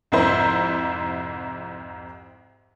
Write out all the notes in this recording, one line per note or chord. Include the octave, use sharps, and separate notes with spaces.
C2 F2 G#2 E4 C5